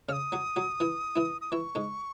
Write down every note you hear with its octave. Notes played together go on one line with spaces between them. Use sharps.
C#3 C#4 F6
D#6
F#3 F#4
F#3 F#4
E3 E4
E3 E4
D#6
E3 E4 C#6
G#2 G#3